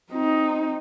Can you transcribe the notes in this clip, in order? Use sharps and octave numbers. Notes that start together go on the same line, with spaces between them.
C4 D#4